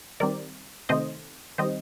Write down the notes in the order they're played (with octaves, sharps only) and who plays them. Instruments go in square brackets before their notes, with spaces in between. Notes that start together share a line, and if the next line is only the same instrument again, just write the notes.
[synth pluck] D#3 G3 C4 A#4 D5
C3 D#3 A3 C4 C5 D#5
D#3 G3 C4 C5 D#5